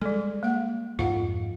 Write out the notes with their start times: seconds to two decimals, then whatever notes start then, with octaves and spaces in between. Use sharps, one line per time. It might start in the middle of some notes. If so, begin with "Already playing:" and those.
0.01 G3 G#3 A4
0.43 A#3 F#5
0.99 F2 G#2 F4 F5 F#5